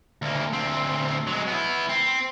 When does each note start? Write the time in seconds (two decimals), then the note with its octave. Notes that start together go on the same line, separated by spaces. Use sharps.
0.22 D2 A#3
0.53 D2 C4
1.27 F#3 G#3
1.47 B3 E4
1.89 C4